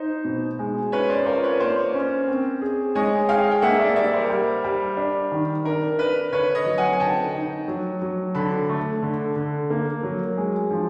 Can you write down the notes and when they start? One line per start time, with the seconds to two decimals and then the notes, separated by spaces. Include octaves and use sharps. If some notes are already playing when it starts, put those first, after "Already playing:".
Already playing: D#4 C5
0.25 B2
0.59 G#3
0.92 C#4 B4 C#5
1.10 C5 D5
1.26 F4 A#4 C5
1.43 B4 C#5
1.60 A#3 C5 D5
1.94 C#4
2.28 C4
2.62 G#4
2.95 G#3 C#5 D#5
3.29 G#4 F5 G5
3.51 G5
3.62 A#3 E5 F#5
3.80 D5 E5
3.96 G3 D5 E5
4.13 A#4 C5
4.30 G3
4.64 G3
4.97 D4
5.31 D#3
5.65 D4 A#4
5.99 D4 B4
6.33 D3 B4 C#5
6.55 C#5 D#5
6.66 F#3
6.78 F#5 G#5
6.93 G#5
7.00 D3 G5 A5
7.34 D#4
7.68 F#3
8.02 F#3
8.35 D3 A5 B5
8.69 A3
9.03 D3
9.36 D3
9.70 A#3
10.03 F#3
10.37 G#3
10.71 F3